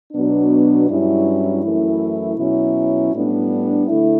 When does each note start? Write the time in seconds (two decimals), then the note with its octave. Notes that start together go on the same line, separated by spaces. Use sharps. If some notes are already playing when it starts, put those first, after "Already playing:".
0.13 B2 F#3 B3 D4
0.88 G2 F#3 C#4 E4
1.62 F#2 E3 A3 E4
2.37 B2 F#3 C#4 E4
3.12 A2 G3 B3 D4
3.88 D3 A3 E4